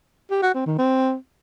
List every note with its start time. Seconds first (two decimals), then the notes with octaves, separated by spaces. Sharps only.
0.31 G4
0.43 F#4
0.55 C4
0.67 D#3
0.79 C4